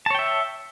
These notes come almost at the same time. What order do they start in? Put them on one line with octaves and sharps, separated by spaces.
A5 C#5 G5 E5